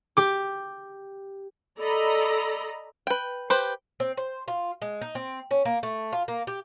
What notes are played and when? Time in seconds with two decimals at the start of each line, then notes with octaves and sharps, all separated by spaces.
0.17 G4 D6
1.79 A4 D5 D#5 A#5 B5
3.07 B4 G5
3.50 G4 B4 C5
4.00 C4
4.17 C5
4.48 F4
4.82 G#3
5.01 D#4
5.15 C4
5.51 C#4
5.65 A#3
5.83 A3
6.13 F4
6.28 A#3
6.47 G4